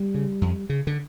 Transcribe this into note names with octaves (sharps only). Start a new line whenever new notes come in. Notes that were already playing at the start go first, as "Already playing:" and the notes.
Already playing: G3
C#3
F2
C#3
D3